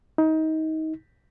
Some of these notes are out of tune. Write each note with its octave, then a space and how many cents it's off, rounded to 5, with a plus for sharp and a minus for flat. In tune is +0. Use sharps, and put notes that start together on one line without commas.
D#4 +25